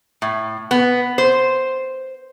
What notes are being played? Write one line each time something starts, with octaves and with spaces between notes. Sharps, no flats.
A2
B3
C5